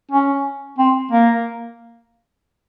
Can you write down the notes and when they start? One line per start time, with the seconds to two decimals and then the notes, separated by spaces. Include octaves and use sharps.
0.11 C#4
0.78 C4
1.12 A#3